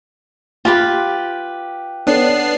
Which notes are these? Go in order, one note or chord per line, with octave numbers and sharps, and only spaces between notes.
F4 G4 B4 G5
B3 D4 A4 C#5 C7